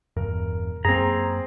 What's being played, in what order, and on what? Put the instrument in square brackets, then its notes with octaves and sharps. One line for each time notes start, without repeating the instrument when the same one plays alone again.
[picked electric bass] E1 E2 G2 [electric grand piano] A#4
[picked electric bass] F#2 A#3 [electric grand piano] C4 G#4 [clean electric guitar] A#5